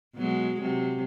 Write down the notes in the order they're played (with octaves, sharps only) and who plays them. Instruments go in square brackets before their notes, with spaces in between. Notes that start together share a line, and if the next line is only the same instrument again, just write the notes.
[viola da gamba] B2 F#3 G#3
C3 F#3